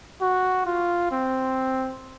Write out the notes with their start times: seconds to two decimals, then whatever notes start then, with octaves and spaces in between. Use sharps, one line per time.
0.21 F#4
0.66 F4
1.12 C4